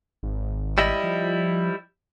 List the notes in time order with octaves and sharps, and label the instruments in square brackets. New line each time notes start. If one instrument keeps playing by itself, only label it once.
[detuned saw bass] G#1
[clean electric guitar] G3 E4 D#5
[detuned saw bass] F3